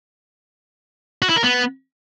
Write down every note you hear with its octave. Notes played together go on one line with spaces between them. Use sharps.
F#4
E4
A#4
B3